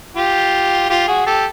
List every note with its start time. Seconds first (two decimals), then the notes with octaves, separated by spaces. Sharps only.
0.17 F4 G4
0.90 F4 G4
1.08 F#4 G#4
1.26 G4 A4